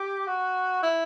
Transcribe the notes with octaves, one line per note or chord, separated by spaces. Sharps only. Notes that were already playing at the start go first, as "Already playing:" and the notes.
Already playing: G4
F#4
E4